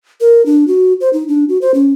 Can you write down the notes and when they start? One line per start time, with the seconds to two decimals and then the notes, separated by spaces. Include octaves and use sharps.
0.21 A#4
0.46 D4
0.68 F#4
1.01 C5
1.13 D#4
1.28 D4
1.49 F#4
1.62 C5
1.74 C#4